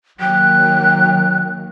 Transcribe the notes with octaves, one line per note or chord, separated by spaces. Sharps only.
D#3 F#3 A#3 G5 F#6